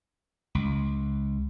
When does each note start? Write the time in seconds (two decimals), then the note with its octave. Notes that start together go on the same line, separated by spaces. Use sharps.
0.55 C#2